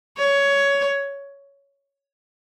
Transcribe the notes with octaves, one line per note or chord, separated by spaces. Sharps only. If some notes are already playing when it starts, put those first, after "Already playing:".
C#5